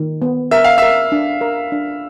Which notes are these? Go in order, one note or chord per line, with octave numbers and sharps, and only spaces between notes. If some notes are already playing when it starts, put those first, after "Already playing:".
Already playing: D#3
B3
A#4 E5
F5
A#4 E5
D4
A#4
D4